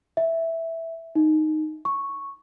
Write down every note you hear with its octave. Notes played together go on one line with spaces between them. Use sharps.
E5
D#4
C#6